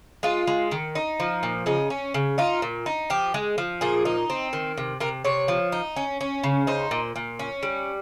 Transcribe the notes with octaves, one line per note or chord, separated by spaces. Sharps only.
G#3 F4
G#3
D#3
D#4
F3
A#2
C#3 D#4
C#4
C#3
D#4 F4
A#2
D#4
F3 G4
G#3
F3
A#2 G#4
D#4
C4
D#3
C3
C3 A#4
C3 C#5
F3
D#4
C#4
C#4
C#3
D#4 C5
A#2
A#2
C#4
G3